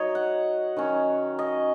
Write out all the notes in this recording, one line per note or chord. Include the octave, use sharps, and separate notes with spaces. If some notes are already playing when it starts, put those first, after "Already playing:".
Already playing: F#3 D#4 C#5 D#5
F#5
D#3 F#3 C#4
D#5